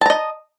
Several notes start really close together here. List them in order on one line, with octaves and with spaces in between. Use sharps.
A5 A#5 D#5